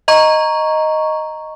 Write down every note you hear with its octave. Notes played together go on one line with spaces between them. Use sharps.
D#5 A#5 C#6